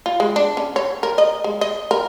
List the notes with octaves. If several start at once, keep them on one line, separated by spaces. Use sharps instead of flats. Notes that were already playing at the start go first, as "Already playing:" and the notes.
F4
G#3
D4
C#4
C#5
A#4
D#5
G#3
D#5
A#4